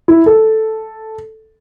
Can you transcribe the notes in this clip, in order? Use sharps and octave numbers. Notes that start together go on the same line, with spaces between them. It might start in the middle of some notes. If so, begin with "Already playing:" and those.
E4
A4